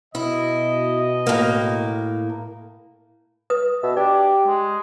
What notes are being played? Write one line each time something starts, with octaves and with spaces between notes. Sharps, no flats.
B2 E4 D#5
A2 A#3
B4 D#6
B2 E5
D4 G4 D5
G#3